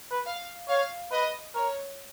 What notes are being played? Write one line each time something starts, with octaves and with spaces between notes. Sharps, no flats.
B4
F5
C#5 F5
B4 D#5
A#4 C#5